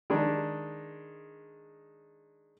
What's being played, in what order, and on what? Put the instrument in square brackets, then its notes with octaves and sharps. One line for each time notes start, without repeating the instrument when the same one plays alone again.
[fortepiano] D#3 G#3 D4